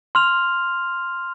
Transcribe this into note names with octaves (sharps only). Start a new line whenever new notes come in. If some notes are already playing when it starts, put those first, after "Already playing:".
C6 F6 F7